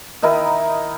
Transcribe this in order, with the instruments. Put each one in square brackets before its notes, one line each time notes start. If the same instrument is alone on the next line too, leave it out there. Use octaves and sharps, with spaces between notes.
[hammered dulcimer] D#3 D#4 E4 A#4